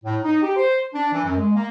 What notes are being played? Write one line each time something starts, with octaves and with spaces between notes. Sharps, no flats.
A2
D#4
G4
C5
D4
E3
F#2
G#3
A#3